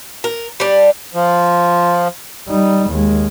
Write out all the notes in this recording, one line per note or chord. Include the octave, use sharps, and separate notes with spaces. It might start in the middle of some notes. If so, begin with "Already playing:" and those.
A#4
G3 D4
F3
G3 D#4
D#2 G#3